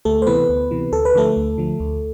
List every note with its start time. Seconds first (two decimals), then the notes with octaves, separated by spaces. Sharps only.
0.05 D2 A3 A4
0.22 C5
0.27 C3 E3 B3 B4
0.49 D2
0.71 C3 E3
0.92 D2 A4
1.05 B4
1.15 D3 F3 A3 A4
1.37 D2
1.58 D3 F3
1.80 D2